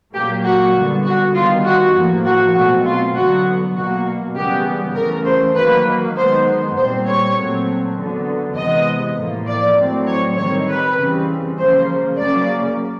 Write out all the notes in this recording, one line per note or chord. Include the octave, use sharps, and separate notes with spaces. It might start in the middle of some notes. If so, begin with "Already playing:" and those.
A#2 F#3 A#3 G4
F#4
D3 G3 B3
F#4
D#3 G3 B3 F4
F#4
A2 F3 A#3
F#4
B2 F#3 A3 C4 F#4
F4
D3 F#3 B3 F#4
B2 F#3 A#3 F#4
C#3 E3 G3 B3 G4
C#3 E3 A3 A#4
C5
D#3 F#3 A#3 B4
D#3 G#3 B3 C5
A#2 G3 C4 C5
C#5
A#2 F#3 A3 C4
D3 F#3 B3
C3 E3 G#3 B3 D#5
A2 F3 A#3
D5
A2 F#3 A3 C4
C#5
D#3 G3 C4 C#5
B4
C#3 E3 G3 C4
C#3 F3 A#3 C5
C#3 F#3 A#3 D5